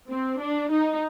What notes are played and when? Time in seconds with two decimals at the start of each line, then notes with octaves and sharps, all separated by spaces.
0.09 C4
0.40 D4
0.71 D#4